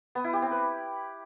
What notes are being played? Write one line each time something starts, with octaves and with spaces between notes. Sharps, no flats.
B3
E4
G4
C4
B4